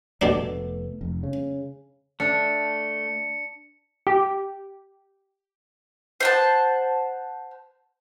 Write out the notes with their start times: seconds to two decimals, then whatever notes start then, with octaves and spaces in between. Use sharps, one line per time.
0.22 F1 B2 A3 B3 D4
1.01 F1
1.23 C#3
2.20 A3 D4 C#7
4.07 G4
6.20 C5 F#5 A5